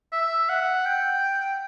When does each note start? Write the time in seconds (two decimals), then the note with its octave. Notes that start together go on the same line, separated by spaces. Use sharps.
0.12 E5
0.49 F#5
0.86 G5